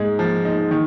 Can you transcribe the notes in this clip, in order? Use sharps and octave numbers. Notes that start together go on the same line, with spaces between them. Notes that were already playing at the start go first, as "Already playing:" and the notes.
Already playing: G#2 G#3
F3
D#4
D#3